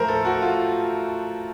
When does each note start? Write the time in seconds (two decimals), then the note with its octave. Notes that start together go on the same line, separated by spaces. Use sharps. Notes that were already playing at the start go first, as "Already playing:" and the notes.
Already playing: A2 F3 A3 A#4 C5
0.08 A4
0.25 F#4
0.42 F4